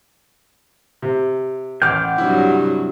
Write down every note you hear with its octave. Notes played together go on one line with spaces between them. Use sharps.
C3
A1 F#5 G5 D6 F6 G6
G2 C3 F#3 E4